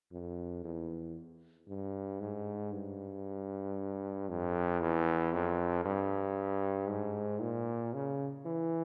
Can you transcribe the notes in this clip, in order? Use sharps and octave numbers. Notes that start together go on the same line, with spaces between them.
F2
E2
G2
G#2
G2
F2
E2
F2
G2
G#2
A#2
C#3
E3